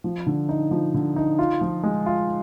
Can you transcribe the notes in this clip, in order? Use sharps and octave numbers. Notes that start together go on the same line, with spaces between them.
F3
D3
D#4
F3
D3
D#4
F4
F3
G#3
F4